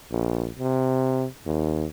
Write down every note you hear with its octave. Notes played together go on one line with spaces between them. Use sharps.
A#1
C3
D#2